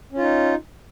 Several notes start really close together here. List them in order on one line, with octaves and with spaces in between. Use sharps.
C#4 F4 D#4